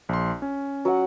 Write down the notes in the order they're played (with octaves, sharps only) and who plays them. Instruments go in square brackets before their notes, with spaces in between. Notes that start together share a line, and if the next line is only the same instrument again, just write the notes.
[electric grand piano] A#1 C6
C#4
[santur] F#3 F#5